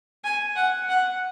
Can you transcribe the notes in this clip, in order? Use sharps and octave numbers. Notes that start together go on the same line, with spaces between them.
G#5
F#5
F#5